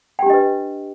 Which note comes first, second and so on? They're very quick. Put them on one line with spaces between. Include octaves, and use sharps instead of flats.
G5 G4 D4 D#5 B4